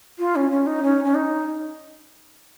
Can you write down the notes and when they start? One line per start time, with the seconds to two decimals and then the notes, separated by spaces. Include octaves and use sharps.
0.19 F4
0.36 C#4
0.51 C#4
0.67 D#4
0.83 C#4
1.05 C#4
1.15 D#4